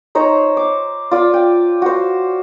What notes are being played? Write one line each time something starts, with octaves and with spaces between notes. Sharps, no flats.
D#4 C5 C#5 A#5
D6
F4 D5
G5
F#4 C5